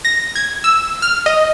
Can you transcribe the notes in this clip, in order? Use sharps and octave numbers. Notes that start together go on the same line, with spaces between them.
A#6
G#6
E6
F6
D#5